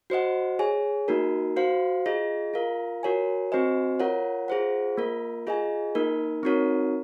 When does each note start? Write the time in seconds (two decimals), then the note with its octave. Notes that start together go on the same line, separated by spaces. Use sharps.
0.10 F#4 C5 D#5 F#5
0.59 G#4 C#5 G#5
1.08 A#3 D#4 F#4 A#4
1.56 F#4 C5 F5
2.06 F4 G#4 D#5
2.54 F4 A#4 F5
3.03 F#4 A#4 C#5 G#5
3.52 C4 F#4 C5 D#5 G#5
4.00 F4 A#4 C#5 F#5
4.48 F4 G#4 C5 F#5
4.97 A#3 F4 A#4
5.47 F4 G#4 D#5 G#5
5.95 A#3 D#4 A#4
6.43 C4 D#4 F#4 A#4 C#5